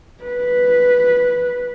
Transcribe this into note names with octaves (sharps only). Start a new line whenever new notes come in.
B4